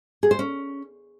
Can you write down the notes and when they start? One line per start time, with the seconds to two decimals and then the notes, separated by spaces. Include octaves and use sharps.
0.23 G#4
0.31 C5
0.39 C#4